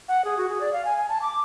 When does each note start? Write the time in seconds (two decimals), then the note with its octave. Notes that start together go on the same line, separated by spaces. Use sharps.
0.08 F#5
0.24 G#4
0.37 F#4
0.49 G#4
0.61 D5
0.73 F5
0.85 G#5
0.98 G#5
1.09 A5
1.22 D6